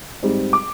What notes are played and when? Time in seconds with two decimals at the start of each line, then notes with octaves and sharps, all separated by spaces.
0.22 G#2 G3 C4
0.53 D6